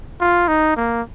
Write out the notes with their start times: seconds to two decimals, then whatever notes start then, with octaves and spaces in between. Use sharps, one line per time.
0.20 F4
0.48 D#4
0.77 A#3